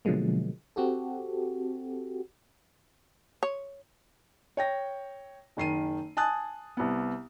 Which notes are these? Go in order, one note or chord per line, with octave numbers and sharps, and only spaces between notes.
B2 D3 F3 F#3 G#3 A#3
C4 F#4 G4 A4
C#5
C#5 G5 A#6
F#1 D#3 C7 D#7
G#5 A5 D#6 F#6 A6
C2 B3